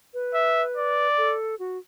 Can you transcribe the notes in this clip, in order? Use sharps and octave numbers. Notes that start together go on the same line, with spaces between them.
B4
E5
D5
A4
F#4